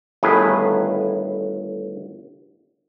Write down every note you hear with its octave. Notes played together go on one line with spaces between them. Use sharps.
G1 A2 D#3 G#4 B4